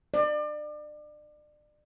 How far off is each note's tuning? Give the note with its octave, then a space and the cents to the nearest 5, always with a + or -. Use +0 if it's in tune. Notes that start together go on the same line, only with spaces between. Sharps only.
D5 +35